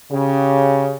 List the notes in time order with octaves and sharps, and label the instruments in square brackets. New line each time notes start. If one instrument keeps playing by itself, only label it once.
[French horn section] C#3 G4